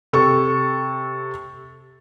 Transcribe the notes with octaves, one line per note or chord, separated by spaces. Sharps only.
C3 A4 C#6